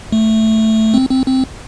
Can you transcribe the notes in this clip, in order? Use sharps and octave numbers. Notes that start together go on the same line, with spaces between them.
A3
C4
C4
C4